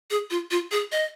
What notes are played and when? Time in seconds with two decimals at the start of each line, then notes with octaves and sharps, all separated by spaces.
0.11 G#4
0.31 F4
0.51 F4
0.71 G#4
0.92 D#5